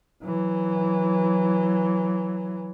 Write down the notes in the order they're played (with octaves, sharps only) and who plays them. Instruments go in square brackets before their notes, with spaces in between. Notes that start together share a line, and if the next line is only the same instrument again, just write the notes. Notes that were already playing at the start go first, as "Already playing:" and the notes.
[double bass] E3 F#3